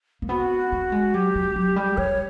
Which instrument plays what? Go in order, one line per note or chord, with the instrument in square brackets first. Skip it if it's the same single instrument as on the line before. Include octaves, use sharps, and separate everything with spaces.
[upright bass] A#3
[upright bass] B3 [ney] F#4
[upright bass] A3
G#3
[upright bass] F#3 [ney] G4
[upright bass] F#3
F#3
G3
[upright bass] G3 [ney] C#5